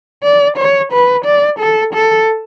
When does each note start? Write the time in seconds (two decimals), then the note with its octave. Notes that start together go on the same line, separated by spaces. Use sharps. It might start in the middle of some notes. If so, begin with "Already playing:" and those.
0.24 D5
0.57 C#5
0.92 B4
1.25 D5
1.59 A4
1.94 A4